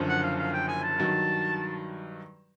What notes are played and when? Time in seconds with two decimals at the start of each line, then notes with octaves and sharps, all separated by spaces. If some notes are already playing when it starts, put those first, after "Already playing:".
Already playing: F#1 F#2 D3 F3
0.09 F#5
0.23 F5
0.39 F5
0.53 G5
0.68 G#5
0.83 A5
0.98 G2 D#3 F#3